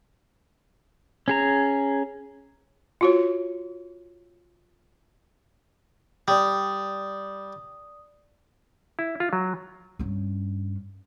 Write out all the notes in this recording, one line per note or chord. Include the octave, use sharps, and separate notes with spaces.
C#4 G#4 A#5
F4 F#4 C#5
G3 D5 D#6
E4
F4
F#3
G2 C#4